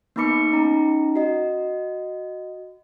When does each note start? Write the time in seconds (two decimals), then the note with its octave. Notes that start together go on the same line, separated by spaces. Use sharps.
0.16 A#3 B3 D#4 B5 D6 C#7
0.52 C#4 D#4 A#5
1.16 F#4 D#5